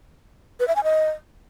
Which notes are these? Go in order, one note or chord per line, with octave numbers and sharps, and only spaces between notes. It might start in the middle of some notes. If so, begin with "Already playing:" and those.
B4
E5
G#5
D#5